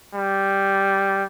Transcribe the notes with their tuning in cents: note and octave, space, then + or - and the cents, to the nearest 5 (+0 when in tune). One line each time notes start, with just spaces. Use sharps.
G3 -5